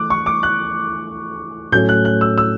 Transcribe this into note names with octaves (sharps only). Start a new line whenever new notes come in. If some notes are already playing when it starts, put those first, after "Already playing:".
Already playing: E3 A3 D6 F#6
C#6
D6
F#6
A2 F#3 A3 C#4 G6
F#6
F#6
E6
E6